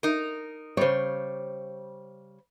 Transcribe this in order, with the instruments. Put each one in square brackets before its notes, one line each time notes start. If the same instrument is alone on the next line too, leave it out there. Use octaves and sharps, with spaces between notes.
[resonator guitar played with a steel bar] D#4 A#4
[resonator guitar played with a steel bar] C#3 G3 [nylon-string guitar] C5 C#5